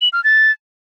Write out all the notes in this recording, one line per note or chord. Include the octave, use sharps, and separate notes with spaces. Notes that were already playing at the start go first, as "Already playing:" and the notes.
F#7
F6
A6